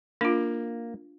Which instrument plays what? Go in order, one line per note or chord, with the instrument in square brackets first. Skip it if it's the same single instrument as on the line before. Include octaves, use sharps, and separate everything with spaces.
[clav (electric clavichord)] A#3 [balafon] D4 F4